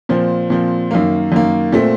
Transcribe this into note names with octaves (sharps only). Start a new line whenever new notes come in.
A#2 F3 C4
A#2 F3 C4
F#2 D#3 A#3
F#2 D#3 A#3
A#2 A3 C4